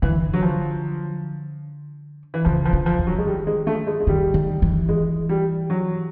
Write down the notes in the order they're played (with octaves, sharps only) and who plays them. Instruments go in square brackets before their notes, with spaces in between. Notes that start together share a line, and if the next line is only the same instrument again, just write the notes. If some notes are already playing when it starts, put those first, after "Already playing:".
[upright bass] D3 [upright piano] E3
[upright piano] F#3
F3
E3
[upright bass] C#3 [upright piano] F3
[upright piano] F3
[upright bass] D3
[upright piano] F3
[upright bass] D#3
[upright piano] F#3
G#3
G3
G#3
A3
G#3
G#3
[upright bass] D#3 [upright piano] G3
[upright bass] D#3
E3
[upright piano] G#3
G3
F#3